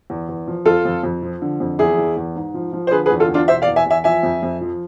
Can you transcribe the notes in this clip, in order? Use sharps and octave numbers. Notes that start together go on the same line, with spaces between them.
E2
E2
F3
F2 F4 A4
F2
F2
F3
D3
F2
E2 E4 G#4
E2
E2
G#2
F3
F3
C5
D3 G#4 B4
G#4 B4
E2
F4 A4
E2
D4 F4
B2 C5 E5
D5 F5
E2
E5 G#5
E2 E5 G#5
F3 E5 G#5
F2
F2
F3